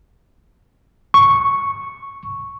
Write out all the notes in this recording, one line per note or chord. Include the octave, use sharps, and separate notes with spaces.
C#6